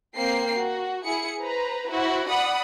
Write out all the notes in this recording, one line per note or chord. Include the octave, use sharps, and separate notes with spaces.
A#3 C4 G5 C7
F#4
E4 G#4 C#7
B4 C5 A#5
E4 F#4 C5 F#5
D5 F#5 B5 D#6